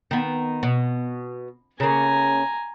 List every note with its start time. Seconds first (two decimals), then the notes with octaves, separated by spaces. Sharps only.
0.11 D#3 B3
0.63 B2
1.80 C#3 A#3 G#5 A#5